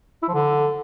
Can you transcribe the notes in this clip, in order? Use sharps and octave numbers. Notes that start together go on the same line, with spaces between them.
E4
F3
D3